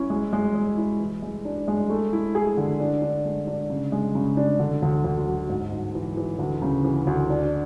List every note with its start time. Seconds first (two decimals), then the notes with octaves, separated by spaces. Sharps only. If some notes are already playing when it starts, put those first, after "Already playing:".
Already playing: C#4 E4
0.10 G#3
0.33 G#3
0.55 G#3
0.77 E4
1.00 E3
1.22 G#3
1.45 D4
1.68 G#3
1.90 A3
2.13 E4
2.35 G#4
2.57 D3
2.80 D4
3.02 D4
3.25 G#3
3.47 D4
3.70 C#3
3.92 G#3
4.15 C#3
4.37 D4
4.59 D3
4.82 D2
5.04 D2
5.27 F#3
5.49 G#2
5.72 G#2
5.95 E3
6.17 E3
6.39 D2
6.62 C#3
6.84 E3
7.07 D2
7.30 D4